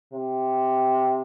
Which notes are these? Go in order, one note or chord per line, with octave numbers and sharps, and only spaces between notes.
C3